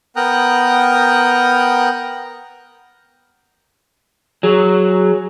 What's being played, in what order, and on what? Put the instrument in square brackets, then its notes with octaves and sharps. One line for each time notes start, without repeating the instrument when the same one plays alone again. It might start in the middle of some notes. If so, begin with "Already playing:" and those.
[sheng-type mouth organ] B3 A#4 G5 A#5 D#6 F#6
[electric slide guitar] F#3 [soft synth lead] G#4